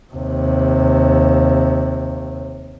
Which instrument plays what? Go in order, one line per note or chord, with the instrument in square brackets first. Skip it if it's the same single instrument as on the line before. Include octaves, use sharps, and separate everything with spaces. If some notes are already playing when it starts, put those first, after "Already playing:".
[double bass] D#2 C3